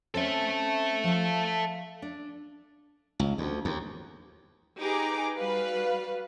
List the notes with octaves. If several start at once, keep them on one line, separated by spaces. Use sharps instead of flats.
C4 C#4 A4 C5 E5
F3 F5
D4
C#2
D2
D#2
D#4 G4 G#4 B4 A#5 D6
G3 F#4 B4 F5